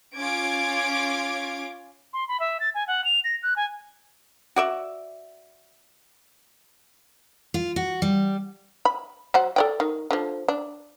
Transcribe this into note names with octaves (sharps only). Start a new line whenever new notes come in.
C#4 F4 D6 G#6 D7
C6
B5
E5
A6
G#5
F#5
F7
A#6
F#6
G#5
F#4 D5 E5
F4
F#4
G3
B5
F#3 C5 F#5
A4 D5 G5
D#3
D3 F3
D4